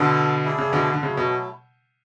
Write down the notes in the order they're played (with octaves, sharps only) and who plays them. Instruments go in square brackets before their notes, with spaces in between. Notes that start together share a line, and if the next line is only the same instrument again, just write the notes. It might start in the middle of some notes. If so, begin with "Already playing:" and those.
Already playing: [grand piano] B2 D3 [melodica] B3 E4 A4
[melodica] A3 E4 G#4 D5
[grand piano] C#3
B2 D3
D3
[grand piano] C#3 [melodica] F#3 A3 E4
[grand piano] B2